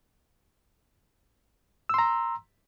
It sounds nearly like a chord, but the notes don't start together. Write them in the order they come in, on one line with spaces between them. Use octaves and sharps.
E6 C6 A#5